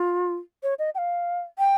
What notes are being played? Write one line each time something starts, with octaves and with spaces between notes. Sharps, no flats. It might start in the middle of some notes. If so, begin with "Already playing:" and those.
Already playing: F4
C#5
D#5
G5
F5
G5